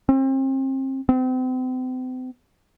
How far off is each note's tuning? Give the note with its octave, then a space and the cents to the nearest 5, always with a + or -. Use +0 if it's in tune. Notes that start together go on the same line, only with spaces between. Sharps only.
C4 +35
C4 -40